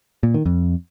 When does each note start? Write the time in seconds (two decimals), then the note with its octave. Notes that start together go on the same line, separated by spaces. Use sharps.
0.23 A#2
0.34 D#3
0.46 F2